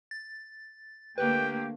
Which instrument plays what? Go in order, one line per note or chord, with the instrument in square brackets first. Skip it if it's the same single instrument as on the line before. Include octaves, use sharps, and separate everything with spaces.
[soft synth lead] A6
[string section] D3 A3 A#3 [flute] G4 [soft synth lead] B4 [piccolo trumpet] G5